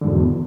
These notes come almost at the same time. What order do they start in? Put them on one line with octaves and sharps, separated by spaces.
D3 G#2 E2 B2